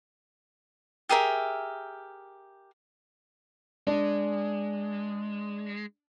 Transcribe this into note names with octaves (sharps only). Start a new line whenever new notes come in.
G4 G#4 A#4 E5
G#3 D4